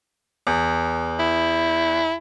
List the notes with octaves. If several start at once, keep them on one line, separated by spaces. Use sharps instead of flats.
E2
E4